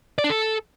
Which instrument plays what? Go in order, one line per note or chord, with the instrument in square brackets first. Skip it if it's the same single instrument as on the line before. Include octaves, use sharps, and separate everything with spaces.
[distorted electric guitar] D5
D4
A4